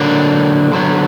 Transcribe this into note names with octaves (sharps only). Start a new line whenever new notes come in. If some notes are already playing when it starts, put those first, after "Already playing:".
Already playing: D3 F#3 A#3 D4
D3 F#3 B3